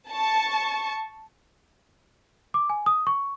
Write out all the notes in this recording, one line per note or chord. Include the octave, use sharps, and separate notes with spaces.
A5 C#6
D6
G#5
D#6
C#6